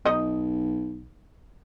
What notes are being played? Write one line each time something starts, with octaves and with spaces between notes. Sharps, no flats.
B1 D#4 D#5